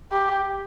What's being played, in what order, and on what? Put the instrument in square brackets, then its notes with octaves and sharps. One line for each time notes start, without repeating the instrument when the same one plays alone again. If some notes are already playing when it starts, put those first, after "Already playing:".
[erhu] G4